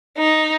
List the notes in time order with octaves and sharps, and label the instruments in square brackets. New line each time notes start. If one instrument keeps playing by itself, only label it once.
[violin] D#4